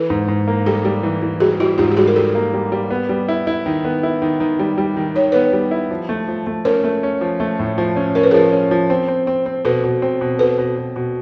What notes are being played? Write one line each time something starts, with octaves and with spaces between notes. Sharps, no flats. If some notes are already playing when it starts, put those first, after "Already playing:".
Already playing: E3 A4 B4
G#2
G#2
A#3
G3 G4 A4
G3
E3
E3
G3 F#4 G#4
G3 E4 F#4
G#2 F4 G4
G4
G3 F#4 G#4
A#4
G3 G4 A4
A#3
G3
G3
B3
G3
E4
E4
D#3
B3
E4
D#3
D#3
G3
G3
D#3
D#3 C#5
B3 B4 C#5
G3
E4
F3
A3
F3
A3
C#4 A#4 C5
A3
C#4
F3
A3
A2
F3
C#4
C#4 A#4
B4
F3 G#4 A#4
C#4
F3
C4
C4
C4
C4
B2 A4 B4
B2
C4
B2
B2 A4 B4
B2
B2
B2